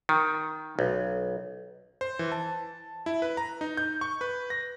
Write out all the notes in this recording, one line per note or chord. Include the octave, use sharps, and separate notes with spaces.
D#3
B1
C5
E3
A5
E4
B4
A#5
D#4
G6
C#6
B4
A#6